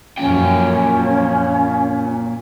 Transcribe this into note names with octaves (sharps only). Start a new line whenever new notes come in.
F#2 A#2 F3 C#4 G5